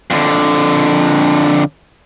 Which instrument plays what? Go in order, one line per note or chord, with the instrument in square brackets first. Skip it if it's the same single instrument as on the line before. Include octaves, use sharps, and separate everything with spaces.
[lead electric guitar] F2 D3